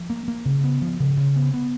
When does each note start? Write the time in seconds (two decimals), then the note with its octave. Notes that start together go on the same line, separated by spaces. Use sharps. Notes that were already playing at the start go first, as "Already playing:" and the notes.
Already playing: F3
0.10 A#3
0.28 A#3
0.45 C#3
0.64 B3
0.82 F3
1.00 C#3
1.17 C#3
1.36 B3
1.54 B3